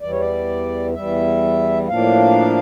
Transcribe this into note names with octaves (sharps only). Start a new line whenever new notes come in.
E2 E3 G3 D5
C#5
D5
E2 E3 G3 E5
A2 F3 A#3 D4 F5